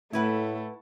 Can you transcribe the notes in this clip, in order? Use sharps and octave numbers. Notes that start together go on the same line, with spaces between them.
A2 A3 E4 B4 F#5